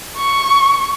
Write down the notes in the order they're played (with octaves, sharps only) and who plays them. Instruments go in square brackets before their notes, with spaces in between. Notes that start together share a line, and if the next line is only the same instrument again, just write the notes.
[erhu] C#6